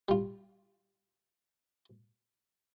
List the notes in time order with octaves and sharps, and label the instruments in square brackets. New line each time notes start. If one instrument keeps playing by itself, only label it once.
[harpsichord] G3 F4